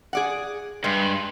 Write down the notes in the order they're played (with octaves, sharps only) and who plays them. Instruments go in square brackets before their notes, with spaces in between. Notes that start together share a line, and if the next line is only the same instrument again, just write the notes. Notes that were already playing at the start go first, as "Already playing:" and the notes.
[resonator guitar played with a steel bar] G#4 D5 F#5
[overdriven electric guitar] G2 [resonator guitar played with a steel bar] G#3